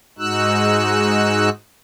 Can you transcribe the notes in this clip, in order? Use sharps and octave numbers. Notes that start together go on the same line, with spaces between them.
G#2 G#3 D#4 F#4 E6 F#6